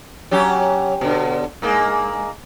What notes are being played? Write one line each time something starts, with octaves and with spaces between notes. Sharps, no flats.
F#3 C#4 G4
B2 D3
G2 G#3 A#3